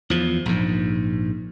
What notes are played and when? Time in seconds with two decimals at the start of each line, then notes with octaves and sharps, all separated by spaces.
0.10 E2 F3
0.46 A#1 G#2